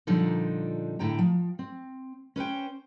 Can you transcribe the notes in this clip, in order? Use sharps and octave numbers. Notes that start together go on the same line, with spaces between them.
A#2 D3 F3 G3 D4 D#4
A2 D3 G5 A#5
F3
C4
C#4 B4 C5 G5